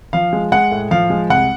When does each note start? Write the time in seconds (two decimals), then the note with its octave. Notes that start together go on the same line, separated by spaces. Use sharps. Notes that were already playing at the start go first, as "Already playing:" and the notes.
0.13 F3 F5
0.33 G#3
0.52 G#3 F#5
0.71 A2
0.91 F3 F5
1.10 G#3
1.30 C2 F#5